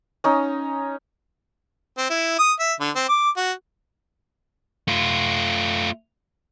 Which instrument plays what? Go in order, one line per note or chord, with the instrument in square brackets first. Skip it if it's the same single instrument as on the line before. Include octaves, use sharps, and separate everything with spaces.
[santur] C#4 D#4
[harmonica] C4
E4
D#6
E5
D3
C4
D6
F#4
[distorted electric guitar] A3 F4